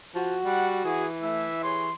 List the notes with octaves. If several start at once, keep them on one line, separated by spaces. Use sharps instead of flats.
F3 F#4
G3 F#5
E3 G#4
A3 E4 E5
G4 G#4 C#5 C6